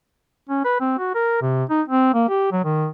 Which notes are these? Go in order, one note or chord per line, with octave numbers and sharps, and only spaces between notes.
C#4
B4
C4
F#4
A#4
C3
D#4
C4
A#3
G4
F#3
D#3